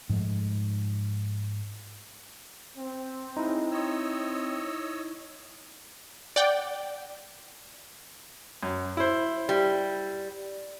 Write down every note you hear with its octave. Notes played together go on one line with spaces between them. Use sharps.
G#2 F3 G#3 A3
C4
A2 G#3 D#4 E4
C#5 D#5 E6
D5 F#5 G5
F#2
E4 C5
G3